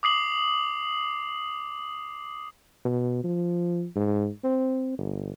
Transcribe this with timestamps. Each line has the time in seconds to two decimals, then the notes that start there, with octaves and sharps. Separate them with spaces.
0.03 D6 D#6 C7 F#7
2.85 B2
3.23 F3
3.95 G#2
4.44 C4
4.98 G1